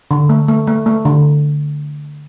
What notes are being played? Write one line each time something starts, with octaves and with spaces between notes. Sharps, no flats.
D3
A3
A3
A3
A3
D3